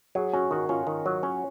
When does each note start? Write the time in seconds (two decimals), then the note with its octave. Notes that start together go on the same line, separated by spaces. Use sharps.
0.15 F#3 G#4
0.33 C#4 F#4
0.51 D#3 F#4
0.69 C#4 F4
0.87 D#3
1.06 F#3
1.23 C#4